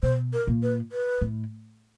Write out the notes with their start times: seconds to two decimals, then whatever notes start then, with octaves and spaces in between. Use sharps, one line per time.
0.03 B2 C5
0.33 A#4
0.47 A#2
0.63 B4
0.92 B4
1.21 A2